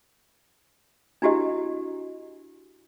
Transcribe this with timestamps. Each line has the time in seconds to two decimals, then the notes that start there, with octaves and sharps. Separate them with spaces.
1.22 D4 E4 F#4 G4 D#5